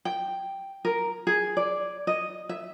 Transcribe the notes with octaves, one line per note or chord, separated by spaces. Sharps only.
G5
A#4
G#4
D5
D#5
E5